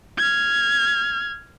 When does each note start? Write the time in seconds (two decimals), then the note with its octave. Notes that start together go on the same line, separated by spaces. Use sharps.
0.18 F6 G#6